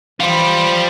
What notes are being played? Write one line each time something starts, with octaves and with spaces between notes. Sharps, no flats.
E3 G3 F4 C5 B5